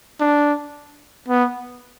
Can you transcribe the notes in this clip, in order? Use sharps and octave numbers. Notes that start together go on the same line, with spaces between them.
D4
B3